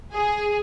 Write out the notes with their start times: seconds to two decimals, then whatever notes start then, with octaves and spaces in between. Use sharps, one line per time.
0.13 G#4